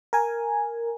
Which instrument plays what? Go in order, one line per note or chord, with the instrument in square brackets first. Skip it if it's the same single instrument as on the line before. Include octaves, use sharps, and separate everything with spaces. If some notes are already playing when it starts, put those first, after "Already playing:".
[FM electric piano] A#4 G#5